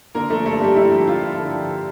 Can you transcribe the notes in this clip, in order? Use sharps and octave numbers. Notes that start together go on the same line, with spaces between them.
D3 A#3 A#4
F3 A3 A4
G2 A3 A4
G2 G3 G4
D3 E4
F3
G2 F4
G2
D3
F3